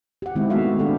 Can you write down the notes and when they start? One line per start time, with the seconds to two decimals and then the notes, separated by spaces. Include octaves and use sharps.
0.22 G4 F#5
0.35 D#3 G#3 C4 E4
0.50 A3 B3 F#4 E5 F5
0.79 D4 G4 A4